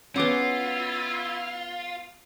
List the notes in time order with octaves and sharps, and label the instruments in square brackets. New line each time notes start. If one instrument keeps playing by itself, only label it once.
[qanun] B3 F#5 [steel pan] C#4 D6 [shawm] E4 [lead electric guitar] F4